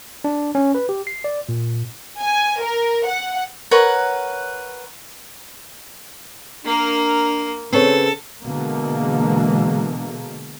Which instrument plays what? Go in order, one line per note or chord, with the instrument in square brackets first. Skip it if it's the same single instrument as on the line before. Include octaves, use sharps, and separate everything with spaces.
[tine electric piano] D4
C#4
B4
G4
C7
D5
A#2
[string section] G#5
A#4
F#5
[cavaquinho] A#4 B4 C#5 F#5
[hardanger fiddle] A#3 A#4 [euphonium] D4
[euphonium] C#3 [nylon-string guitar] C4 B4 C#5 [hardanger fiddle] A4
[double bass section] B2 D3 E3 G#3 A#3